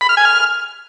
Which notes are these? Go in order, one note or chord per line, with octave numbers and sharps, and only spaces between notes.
B5
F6
G#5
F6